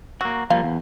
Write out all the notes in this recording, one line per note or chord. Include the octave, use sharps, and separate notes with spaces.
F#3 A#3 F#4
F3 G3 A#3 F5
E2